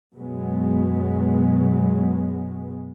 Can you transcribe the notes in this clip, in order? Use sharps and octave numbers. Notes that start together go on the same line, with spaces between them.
F#2 B2 F#3 G#3 B3